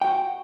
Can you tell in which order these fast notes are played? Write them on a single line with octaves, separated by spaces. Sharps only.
G5 F#4 F#5